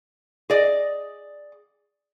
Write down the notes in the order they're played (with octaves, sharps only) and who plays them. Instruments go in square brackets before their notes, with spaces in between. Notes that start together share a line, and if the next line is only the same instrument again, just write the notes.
[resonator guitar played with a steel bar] G#4 D5 D#5